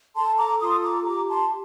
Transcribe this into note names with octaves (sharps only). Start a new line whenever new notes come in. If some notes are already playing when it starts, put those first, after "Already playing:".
A4 A5 C6
A#5 D6
F4 C6 D#6
A#5 D6
G4 A#5 D6
A5 C6